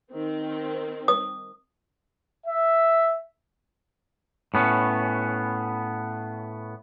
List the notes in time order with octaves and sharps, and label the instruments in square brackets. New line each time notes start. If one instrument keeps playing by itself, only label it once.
[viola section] D#3 C4
[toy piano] D#6
[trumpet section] E5
[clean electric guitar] A2 B3 C#4